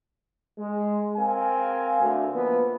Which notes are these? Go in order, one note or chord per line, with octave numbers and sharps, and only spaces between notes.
G#3
C4 A#4 F5 G#5
D2
F3 A#3 B3